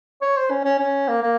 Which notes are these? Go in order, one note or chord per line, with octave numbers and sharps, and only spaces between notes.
C#5
C5
C#4
C#4
C#4
A#3
A#3